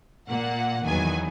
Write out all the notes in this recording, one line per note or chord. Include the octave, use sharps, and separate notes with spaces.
A#2 A#3 F#5
E2 D#3 F#3 B3 G#5